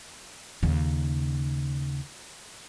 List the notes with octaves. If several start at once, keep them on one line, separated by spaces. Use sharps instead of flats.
D#2 C#3